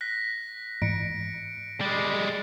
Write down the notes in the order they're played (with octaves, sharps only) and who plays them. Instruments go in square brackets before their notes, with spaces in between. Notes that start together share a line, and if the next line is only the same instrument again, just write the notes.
[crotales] F#6 A#6 B6
[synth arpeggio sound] G#2 E3 [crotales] C#7 D7
[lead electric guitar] G3 G#3 [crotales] A6